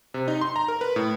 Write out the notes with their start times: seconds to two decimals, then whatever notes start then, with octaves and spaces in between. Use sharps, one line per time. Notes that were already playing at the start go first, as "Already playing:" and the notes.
0.14 C3
0.28 D#4
0.41 C6
0.56 A#5
0.68 A#4
0.81 B4
0.96 A2